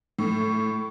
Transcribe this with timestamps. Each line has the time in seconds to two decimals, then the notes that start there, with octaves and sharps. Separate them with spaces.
0.18 A2